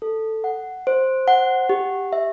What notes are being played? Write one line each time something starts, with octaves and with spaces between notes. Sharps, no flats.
A4
F#5
C5
F#5
G4
E5